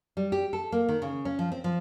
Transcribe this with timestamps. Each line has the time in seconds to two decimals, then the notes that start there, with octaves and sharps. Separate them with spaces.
0.17 G3
0.32 G4
0.53 A4
0.72 A#3
0.89 D#3
1.02 C#3
1.25 C#4
1.39 F3
1.52 C4
1.64 F3